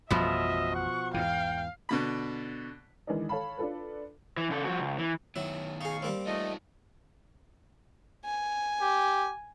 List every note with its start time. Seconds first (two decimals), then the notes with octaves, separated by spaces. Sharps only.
0.10 A1 F2 B2 F3 G3 D#5 E5
0.75 F#5 C#6
1.14 E2 G#2 E3 F5 G5
1.89 B2 D3 B5
3.07 D#3 E3 G#3 D4 D#4
3.29 A4 C#5 F5 A5 B5
3.58 D4 F4 A4 B4
4.37 E3
4.50 C#3 A4
4.65 F3 F#4
4.79 C#2
4.98 E3
5.36 D#3 F#3 B3 E4
5.81 D#4 G#4 F5 C#6
6.02 G3 A#3 C4
6.27 A3 D#4 F4 A4 D#5
8.25 G#5
8.81 G4